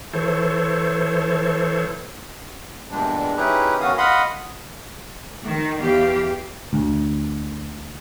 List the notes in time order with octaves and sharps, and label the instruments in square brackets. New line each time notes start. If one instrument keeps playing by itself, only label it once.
[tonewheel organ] E3 A4 C5 C#5
[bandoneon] E2 G2 A#2 G3 G#3 D4
C#4 D#4 E4 G4 G#4 B4
D#3 B3 C#4 F#4 F5 D#6
D#5 F5 F#5 B5 C6 D#6
[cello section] D#3
E2 G4 F5
[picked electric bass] D2